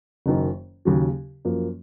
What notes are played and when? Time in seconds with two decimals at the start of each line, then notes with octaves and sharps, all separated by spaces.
0.26 F#1 F#2 D#3
0.85 D#2 C#3 F#3
1.45 F#2 F3 A#3